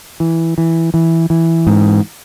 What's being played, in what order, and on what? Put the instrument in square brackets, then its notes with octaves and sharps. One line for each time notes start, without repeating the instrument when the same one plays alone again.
[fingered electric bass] E3
E3
E3
E3
G#2